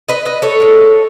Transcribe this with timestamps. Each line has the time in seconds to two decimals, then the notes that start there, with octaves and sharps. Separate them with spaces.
0.08 B4 D#5
0.25 B4 D#5
0.42 A4 C#5
0.60 A2 G#3